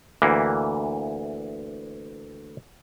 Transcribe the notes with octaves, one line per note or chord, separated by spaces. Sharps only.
D2 E3 A#3